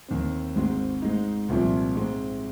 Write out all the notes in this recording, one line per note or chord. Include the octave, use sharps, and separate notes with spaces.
D#2 D#3 C4
G#1 G#2 G#3 C4
G#2 G#3 D#4
C2 A#2 F3 C4
G#2 G#3 C4